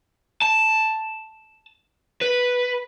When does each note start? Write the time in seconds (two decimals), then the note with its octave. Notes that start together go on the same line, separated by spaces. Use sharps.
0.42 A5
2.21 B4